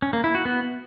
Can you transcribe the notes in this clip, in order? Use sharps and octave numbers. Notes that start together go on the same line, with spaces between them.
C#4
A#3
E4
F#4
B3